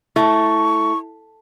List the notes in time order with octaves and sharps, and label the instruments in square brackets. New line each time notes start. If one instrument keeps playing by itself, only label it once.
[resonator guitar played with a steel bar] A3 [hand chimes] E4 [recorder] C#6